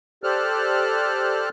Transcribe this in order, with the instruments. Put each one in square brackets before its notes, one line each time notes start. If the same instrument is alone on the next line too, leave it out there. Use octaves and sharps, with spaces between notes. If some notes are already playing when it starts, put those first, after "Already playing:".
[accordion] G4 A4 C5 D5 F6 F#6